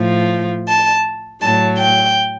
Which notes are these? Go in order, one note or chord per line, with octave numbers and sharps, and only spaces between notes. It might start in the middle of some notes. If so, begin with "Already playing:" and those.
Already playing: A2 F3
A5
A2 F#3 A5
G5